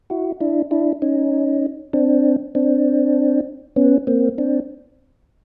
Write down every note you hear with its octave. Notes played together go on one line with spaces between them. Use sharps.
E4 F#4
D4 E4
D4 E4
C#4 D#4
C4 D4
C4 D4
B3 C#4
A#3 C4
C4 D4